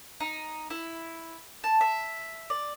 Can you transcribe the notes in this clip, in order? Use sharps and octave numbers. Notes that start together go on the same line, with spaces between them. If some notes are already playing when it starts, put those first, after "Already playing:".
D#4
E4
A5
E5
D5